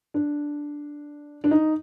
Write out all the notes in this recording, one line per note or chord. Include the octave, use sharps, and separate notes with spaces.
D4
D4
D#4